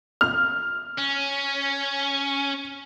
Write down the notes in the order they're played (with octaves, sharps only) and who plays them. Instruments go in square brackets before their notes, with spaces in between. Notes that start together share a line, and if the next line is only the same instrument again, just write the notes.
[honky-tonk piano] F6
[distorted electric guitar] C#4